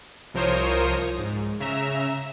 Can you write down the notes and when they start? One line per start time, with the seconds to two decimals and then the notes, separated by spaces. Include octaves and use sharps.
0.34 C2 F3 A#4 C5 C#5 D#6
1.18 G#2
1.60 C#3 E5 A#5 E7